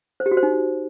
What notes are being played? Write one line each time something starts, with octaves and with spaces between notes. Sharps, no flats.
C5
G4
F#4
C5
D#4